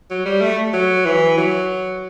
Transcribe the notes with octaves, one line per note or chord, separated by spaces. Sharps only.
F#3
G3
A3
F#3
E3
F#3